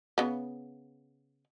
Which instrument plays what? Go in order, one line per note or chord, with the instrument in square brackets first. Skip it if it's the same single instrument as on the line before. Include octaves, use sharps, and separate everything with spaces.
[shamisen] C#3 B3